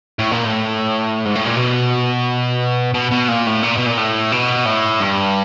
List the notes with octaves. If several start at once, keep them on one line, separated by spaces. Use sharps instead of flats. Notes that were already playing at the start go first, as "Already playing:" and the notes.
A2
A#2
A2
G#2
A2
A#2
B2
B2
B2
A#2
A2
A#2
B2
A#2
A2
B2
A2
G2